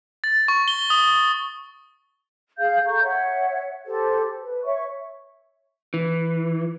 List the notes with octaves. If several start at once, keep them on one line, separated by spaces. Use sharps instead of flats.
A6
C#6
G7
D#6
G#4 F5 G6
A4 A#5 C#6 G6
C#5 E5 F#5
G4 A4 C5
B4
C#5 E5 C#6
E3